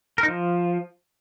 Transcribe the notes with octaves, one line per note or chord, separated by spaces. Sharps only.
A#4
D#4
F3